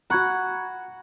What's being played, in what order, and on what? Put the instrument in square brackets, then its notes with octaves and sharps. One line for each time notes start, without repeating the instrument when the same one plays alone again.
[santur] F#4 B5 [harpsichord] F#5 [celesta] A#5 C#6 G#6